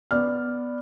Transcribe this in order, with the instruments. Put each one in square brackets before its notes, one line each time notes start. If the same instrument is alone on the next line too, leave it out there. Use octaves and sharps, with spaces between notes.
[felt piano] B3 D5 F6